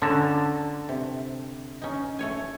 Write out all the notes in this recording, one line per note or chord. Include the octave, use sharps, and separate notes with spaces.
D3 C#4 F4 A4 A5 A#5
C3
C#4 D#4
A3 C#5 G#5